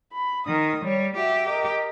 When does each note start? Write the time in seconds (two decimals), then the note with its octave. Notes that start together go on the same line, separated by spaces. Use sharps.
0.13 B5
0.47 D#3 A#4 D#6
0.84 G3 C#5
1.17 F#4 G4 E5
1.49 A#4 D#5